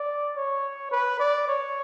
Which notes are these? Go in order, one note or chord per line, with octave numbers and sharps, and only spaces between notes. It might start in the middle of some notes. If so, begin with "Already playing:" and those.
Already playing: D5
C#5
B4
D5
C#5